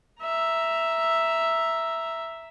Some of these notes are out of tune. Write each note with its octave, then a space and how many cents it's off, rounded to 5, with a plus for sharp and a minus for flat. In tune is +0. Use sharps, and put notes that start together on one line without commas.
E5 +0 A#5 +5